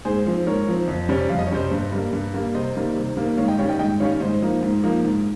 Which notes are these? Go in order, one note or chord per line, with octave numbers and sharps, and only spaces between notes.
G#2 G#4 C5
F3 C4
G#2 A#4 C#5
F3 C4
F2
C3 G3 C#4
F2 F5
D#5
C#5
C3 G3 C#4 C5 D#5
G2
G3 A#3
G2
G3 A#3
C3 C5 D#5
D#3 G3 A#3
C3
D#3 G3 A#3
G#2 C#5 F5
D#5 G5
D#3 G3 C#4 C#5 F5
D#5 G5
G#2 D#5 G5
D#3 G3 C#4 C#5 F5
G#2 C5 D#5
F3 A#3 D#4
G#2
F3 A#3 D#4
G#2